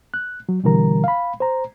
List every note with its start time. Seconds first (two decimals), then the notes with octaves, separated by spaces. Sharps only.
0.14 F#6
0.49 F#3
0.64 B2 D3 E3 G3 A#4 A#5
1.04 F5 B5
1.40 C5 A#5